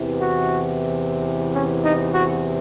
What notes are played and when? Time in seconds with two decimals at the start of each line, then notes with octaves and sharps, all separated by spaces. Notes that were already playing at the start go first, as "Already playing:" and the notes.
Already playing: E2 C3 E3
0.20 F#4
1.54 C#4
1.83 D#4
2.13 F#4